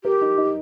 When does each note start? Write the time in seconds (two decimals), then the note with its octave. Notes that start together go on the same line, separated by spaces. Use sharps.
0.04 G4 A#4
0.21 D#4
0.38 D#4